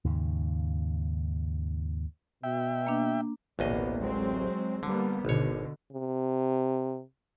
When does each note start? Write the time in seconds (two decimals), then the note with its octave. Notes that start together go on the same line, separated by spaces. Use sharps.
0.05 D#2 G#2 C#3
2.43 B2 E5 G5
2.87 A#3 D4
3.59 A1 D2 B2 A#3 B3 D#5
3.99 F#3 G#3 C4
4.83 D3 G3 A#3 B3
5.25 G#1 B2 D3 C#5
5.92 C3